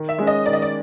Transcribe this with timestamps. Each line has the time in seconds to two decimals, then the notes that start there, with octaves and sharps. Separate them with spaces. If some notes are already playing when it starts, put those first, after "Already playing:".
Already playing: D#3
0.09 E5
0.19 G#3 C#4
0.27 D#5
0.46 D#3 D5
0.53 D#5
0.62 D5